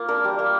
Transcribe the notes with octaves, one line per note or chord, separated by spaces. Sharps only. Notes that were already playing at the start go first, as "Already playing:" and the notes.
Already playing: A#3 F4
D4 A#4
G3
A#3